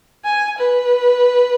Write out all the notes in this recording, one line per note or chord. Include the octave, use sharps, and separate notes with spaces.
G#5
B4